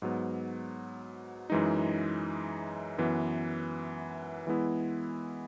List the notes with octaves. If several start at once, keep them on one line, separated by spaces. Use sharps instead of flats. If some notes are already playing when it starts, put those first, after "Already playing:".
G#2 F#3 B3
F#2 E3 G#3 D#4
F#2 E3 B3
E3 G#3 B3 E4